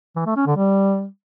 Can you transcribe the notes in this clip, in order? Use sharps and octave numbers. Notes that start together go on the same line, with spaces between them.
E3
A3
C#4
D3
G3